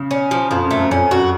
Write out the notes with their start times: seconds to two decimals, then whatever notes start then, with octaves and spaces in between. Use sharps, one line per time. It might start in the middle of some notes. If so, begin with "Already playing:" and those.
Already playing: C#3
0.11 C#4
0.31 F3
0.51 F2 F3
0.65 F#2
0.71 A3
0.78 F#2
0.91 F2 C#4
1.11 F#2 F#4